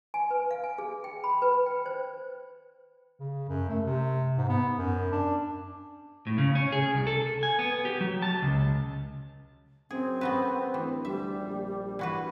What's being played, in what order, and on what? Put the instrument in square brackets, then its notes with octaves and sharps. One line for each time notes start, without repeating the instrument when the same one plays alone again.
[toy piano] G#5
B4
F5
G#5
G#4
G5
B5
B4
G5
C5
[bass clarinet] C#3
F#2
A3
C3
G#2
B3
F#2
D4
[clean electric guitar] A2
C#3
C#4
G#4
C2
A4
G#5
B3
G4
F#3
A5
C#2
[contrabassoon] F#2 [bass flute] C4 [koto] G#4
[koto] B3 F#4 B4
[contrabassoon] D1 [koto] E3
[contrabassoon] D2 [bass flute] G3 [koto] E5
[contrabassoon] A#1
[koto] E3 F#4 B4